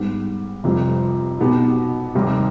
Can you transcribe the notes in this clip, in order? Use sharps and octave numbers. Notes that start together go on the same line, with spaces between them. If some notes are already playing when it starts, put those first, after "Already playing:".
Already playing: G#2 G3 B3
F1 F2 C3 G3
B1 B2 B3 D#4 G4
F1 D#2 D#3 G3